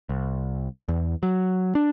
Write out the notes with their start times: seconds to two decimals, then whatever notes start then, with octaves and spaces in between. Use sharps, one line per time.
0.09 C2
0.88 E2
1.23 F#3
1.75 D4